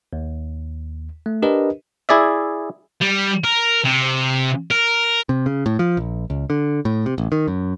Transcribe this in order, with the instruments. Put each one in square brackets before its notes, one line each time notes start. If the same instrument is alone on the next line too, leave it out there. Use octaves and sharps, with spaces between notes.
[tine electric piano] D#2
A3
D4 G4 A#4 B4 D#5
[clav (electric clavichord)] E4 G#4 D5 E5
[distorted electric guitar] G3
A#4
C3
A#4
[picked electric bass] C3
C#3
A2
F3
A#1
C#2
D3
A2
C3
A1
D#3
F#2